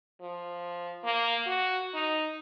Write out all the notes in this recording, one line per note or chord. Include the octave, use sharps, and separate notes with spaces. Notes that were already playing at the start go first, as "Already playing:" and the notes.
F3
A#3
F#4
D#4